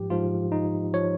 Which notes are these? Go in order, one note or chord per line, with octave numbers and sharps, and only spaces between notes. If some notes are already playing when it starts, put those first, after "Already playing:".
Already playing: G#2 F3 G4
G#2 F3 F4
D#4
F3 C#5